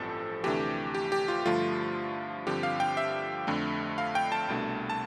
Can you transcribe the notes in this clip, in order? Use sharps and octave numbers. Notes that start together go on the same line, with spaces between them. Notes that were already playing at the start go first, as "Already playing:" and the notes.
Already playing: A1 G2 F3 C4 A4
D2 C3 E3 A3 D4 G4
G4
G4
F4
G2 D3 F3 A3 F4
G2 D3 F3 C4 G4
F5
G5
E5
F2 D3 A3 D4
F5
G5
A5
C2 B2 A3 D4
A5